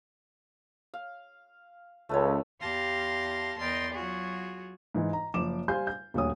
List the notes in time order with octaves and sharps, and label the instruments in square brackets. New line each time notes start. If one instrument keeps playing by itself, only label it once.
[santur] F5
[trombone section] C#2 [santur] A3 B4 C#5
[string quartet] E2 G4 F5 A5 C6 A#6
E2 A#4 D#5 G5 C6 A6
F#3 F4 F#4 G#4
[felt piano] G#2 E3
A#5
F#1 F3 D6 E7
G3 C5 F5 G#5 C6 G6
G6
D#1 D2 C#5 D#6